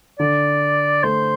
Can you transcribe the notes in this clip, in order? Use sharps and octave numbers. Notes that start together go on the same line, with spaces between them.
D3 D5
A3 C5